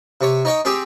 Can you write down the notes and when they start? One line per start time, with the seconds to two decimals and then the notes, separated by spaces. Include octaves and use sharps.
0.21 C3 C#5
0.45 D#4 C#5 G5
0.65 C4 G4 G#4